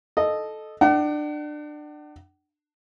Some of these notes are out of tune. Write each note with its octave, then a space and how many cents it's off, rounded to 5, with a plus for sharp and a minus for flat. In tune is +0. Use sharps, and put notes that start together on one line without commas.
A4 -15 D#5 -15
D4 +25 F#5 +45